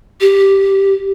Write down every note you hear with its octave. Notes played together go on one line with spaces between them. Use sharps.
G4